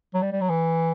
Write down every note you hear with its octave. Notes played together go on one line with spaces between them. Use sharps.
F#3
G3
G3
F#3
E3